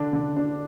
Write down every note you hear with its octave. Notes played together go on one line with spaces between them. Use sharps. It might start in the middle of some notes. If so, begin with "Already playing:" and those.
Already playing: D3 D4 A5
D3
D4